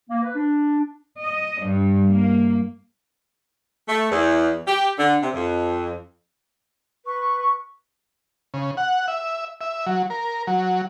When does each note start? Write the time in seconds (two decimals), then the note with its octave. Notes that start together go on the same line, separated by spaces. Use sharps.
0.10 A#3
0.22 B4
0.35 D4
1.21 D#5
1.64 G2
2.11 A#3
3.88 A3
4.11 E2
4.67 G4
4.98 D3
5.22 C3
5.34 F2
7.06 B4 C#6
8.54 C#3
8.77 F#5
9.08 E5
9.61 E5
9.86 F#3
10.10 A#4
10.47 F#3